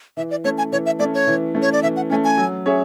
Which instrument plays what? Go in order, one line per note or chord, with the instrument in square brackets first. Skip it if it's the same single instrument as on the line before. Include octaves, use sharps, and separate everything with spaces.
[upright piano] E3 [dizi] E5
[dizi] D5
[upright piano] A3 C#4 [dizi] C#5
[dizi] G#5
[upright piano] E3 [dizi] C#5
[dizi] E5
[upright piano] A3 C#4 [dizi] D5
[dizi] C#5
[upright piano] E3
A3 C#4
[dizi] C#5
D5
[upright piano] E3 [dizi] E5
[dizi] F#5
[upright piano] A3 C#4 [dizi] G#5
[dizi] G#5
[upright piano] F#3
C#4 G#4 C#5 E5